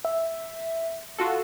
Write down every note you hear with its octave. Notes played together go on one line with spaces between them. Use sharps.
E5
F4 F#4 A4